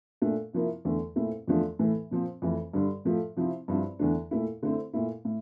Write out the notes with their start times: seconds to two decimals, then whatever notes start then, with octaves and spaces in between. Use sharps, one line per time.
0.22 A#2 A3 D4
0.53 C3 F3 A#3 E4
0.85 E2 D3 A3
1.16 A#2 A3 C4 E4
1.48 E2 D3 F3 A3 D4
1.79 A2 E3 A3
2.11 A#2 F3 C4
2.42 F2 E3 A3
2.73 G2 D3 G3
3.05 A2 F3 A3
3.36 C3 F3 C4 E4
3.68 G2 F3 C4 E4
3.99 E2 D3 A3 D4
4.31 A#2 A3 E4
4.63 D3 A3 C4 E4
4.93 A#2 A3 E4
5.25 A2